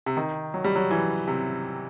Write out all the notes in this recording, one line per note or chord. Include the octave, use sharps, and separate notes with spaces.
C3
D#3
F#3
G3
F#3
E3
C3